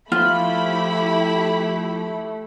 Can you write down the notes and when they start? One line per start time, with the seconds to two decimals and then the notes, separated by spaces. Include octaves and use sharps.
0.12 F3 A3 E4 F4 G4 C5 B5